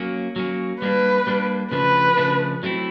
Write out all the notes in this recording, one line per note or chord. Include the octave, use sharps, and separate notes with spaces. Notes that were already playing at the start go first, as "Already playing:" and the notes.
Already playing: F#3 A#3 C#4
F#3 A#3 C#4
G3 A#3 D4 B4
G3 A#3 D4
C#3 F3 A3 D4 B4
C#3 F3 A3 D4
F#3 A3 C4 E4